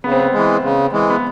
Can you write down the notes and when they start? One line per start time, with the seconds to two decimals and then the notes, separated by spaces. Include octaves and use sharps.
0.04 C#3 B3
0.12 C4
0.20 B3
0.33 E3 G#3
0.63 C#3
0.93 E3 G#3
1.10 B3